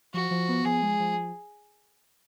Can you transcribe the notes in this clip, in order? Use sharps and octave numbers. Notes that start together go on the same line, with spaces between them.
F3 F#4
F3
B3
F3 G#4
G#3
F3